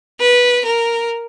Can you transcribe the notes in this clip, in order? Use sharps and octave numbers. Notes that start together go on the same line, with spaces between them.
B4
A#4